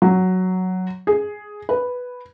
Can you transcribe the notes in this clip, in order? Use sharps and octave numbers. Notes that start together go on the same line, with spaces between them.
F#3
G#4
B4